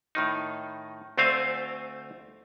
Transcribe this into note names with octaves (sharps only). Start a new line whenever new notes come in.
A2 D#3 D#4
D2 A3 C4 C5 F5 G#5